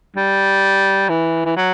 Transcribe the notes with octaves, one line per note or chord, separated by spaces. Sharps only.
G3
E3
E3
F#3